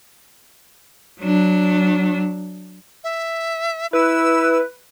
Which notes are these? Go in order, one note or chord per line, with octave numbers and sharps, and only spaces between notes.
F#3 D4
E5
E4 B4 E6